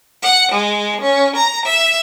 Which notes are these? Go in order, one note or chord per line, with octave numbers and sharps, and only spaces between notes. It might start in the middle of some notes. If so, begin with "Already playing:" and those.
F#5
G#3
C#4
A#5
E5